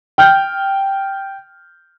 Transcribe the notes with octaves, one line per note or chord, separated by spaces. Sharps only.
G5 F6 G6